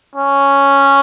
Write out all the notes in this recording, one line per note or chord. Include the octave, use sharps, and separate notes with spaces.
C#4